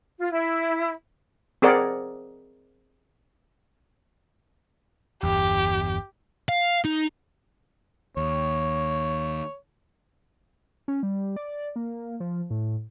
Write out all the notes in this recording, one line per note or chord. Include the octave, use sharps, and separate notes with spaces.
F4
E4
C4 G#4 A#4 D5 F#5
G1 E2 G4
F5
D#4
D#2 C#5
C#4
G3
D5
A#3
F3
A2